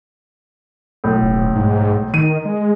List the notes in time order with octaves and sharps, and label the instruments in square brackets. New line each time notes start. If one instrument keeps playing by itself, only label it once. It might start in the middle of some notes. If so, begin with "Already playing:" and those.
[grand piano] B1 A2
[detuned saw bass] D#1
G#2
[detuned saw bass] D#3 [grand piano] D#7
[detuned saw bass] G#3